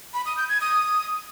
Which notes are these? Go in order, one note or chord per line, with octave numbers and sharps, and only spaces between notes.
B5
D#6
G6
G#6
D#6